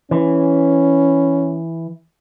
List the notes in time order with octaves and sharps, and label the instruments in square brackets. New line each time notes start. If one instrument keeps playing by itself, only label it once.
[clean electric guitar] E3 [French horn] C#4